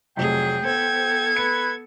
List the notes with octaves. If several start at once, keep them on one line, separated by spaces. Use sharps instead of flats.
F1 F2 C3 F#3 G#4 G5
B3 A4 C5 G#6
B4 C#7